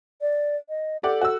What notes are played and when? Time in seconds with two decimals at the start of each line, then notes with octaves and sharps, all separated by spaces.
0.21 D5
0.69 D#5
1.03 G4 A4 D5 F#5
1.21 F#4 E6